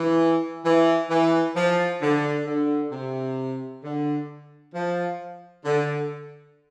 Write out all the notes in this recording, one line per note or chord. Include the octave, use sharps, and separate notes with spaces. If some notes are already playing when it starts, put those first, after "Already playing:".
Already playing: E3
E3
E3
F3
D3
D3
C3
D3
F3
D3